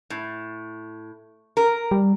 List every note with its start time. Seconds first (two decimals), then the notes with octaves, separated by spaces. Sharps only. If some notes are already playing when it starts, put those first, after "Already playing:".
0.10 A2
1.57 A#4
1.91 G3